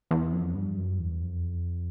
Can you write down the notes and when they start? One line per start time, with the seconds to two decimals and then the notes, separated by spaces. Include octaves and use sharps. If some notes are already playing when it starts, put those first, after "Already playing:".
0.11 E2
0.33 F2
0.55 G2
0.77 F#2
0.99 E2
1.21 F2